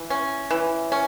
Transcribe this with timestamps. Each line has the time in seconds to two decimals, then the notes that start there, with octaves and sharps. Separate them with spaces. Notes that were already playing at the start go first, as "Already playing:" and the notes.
Already playing: E3
0.10 C#4
0.51 E3
0.92 C#4